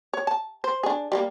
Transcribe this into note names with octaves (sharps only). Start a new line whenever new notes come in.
C#5
A5
C5
D4 G#4
G3 G#3 A#3